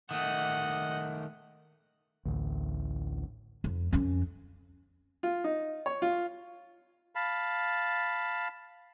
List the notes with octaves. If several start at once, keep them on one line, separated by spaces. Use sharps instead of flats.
D#3 A3 D#5 F#5
A1 D2
F2
F2 C#4
F4
D#4
C#5
F4
F5 A5 B5